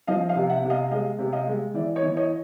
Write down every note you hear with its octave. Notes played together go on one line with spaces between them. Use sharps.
F3 D#5 F5
D#5 F5
C3
E5 F#5
C3
D#5 F5
G#3 D#5 F5
C3
D#5 F5
G#3
E3 D5 E5
C#5 D#5
E3
C#5 D#5